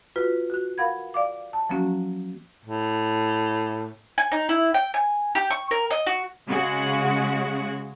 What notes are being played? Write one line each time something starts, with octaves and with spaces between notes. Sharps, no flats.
F4 F#4 B4
F#4 F#6
A#4 F5 F#5 B5 G#6
D5 F5 D6
A5
F3 F#3 A#3 C#4 F#4
A2
G#5
D#4
E4
G5
G#5
G4
C#6
A#4
D#5
F#4
C#3 G#3 F#4